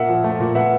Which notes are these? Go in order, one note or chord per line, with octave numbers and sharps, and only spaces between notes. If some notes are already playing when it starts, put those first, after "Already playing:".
Already playing: A#2 A#3 E5 F#5
F3
A3
A#2
B3 E5 F#5